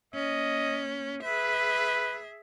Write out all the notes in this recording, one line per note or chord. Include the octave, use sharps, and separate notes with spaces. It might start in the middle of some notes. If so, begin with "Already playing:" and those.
A#3 C#4 D#5
G#4 B4 E5